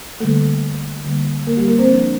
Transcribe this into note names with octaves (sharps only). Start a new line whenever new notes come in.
D3 G3 A3 A#3 A4
D3 G3 A#3
A#3 A#4
G3 G4
A#3 A#4
C4 C5
F3 A#3 D4